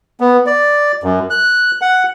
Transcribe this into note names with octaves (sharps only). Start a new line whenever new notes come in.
B3
D5
F#2
F#6
F#5